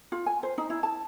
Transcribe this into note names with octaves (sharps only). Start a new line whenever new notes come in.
F4
G#5
C5
D#4
E4
A5